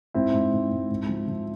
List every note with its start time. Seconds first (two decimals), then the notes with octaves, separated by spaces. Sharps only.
0.14 G#2 C4 E4
0.33 G#2
0.53 G#2
0.71 G#2
0.91 G#2
1.09 F3
1.28 F3